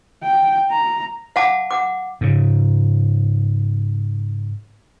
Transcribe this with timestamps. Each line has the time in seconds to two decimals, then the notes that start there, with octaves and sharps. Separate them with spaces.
0.23 G5
0.71 A#5
1.36 F5 F#5 A5 D6
1.71 F#5 D6
2.21 G#2 C#3